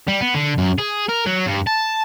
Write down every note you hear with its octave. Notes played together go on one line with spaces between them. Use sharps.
G3
B3
D3
F#2
G#4
A#4
F#3
G2
A5